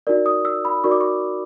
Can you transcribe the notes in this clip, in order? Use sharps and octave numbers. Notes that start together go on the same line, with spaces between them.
D#4 F#4 A#4 D5
D#6
E6
B5
D#4 F#4 A#4 D5 C#6
D6
C#6